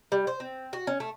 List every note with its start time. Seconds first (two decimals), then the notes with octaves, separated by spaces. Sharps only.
0.12 G3
0.27 C5
0.40 C4
0.73 F#4
0.87 C#4
1.00 A3